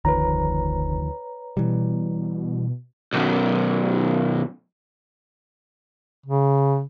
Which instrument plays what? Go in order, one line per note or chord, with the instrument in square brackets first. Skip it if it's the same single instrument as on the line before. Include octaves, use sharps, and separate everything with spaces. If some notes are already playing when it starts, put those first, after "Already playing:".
[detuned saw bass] F1 [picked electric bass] D2 D#3 F3 [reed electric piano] B4 C#5 A#5
[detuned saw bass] B2 [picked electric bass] E3 G3
[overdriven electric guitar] B1 F#2
[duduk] C#3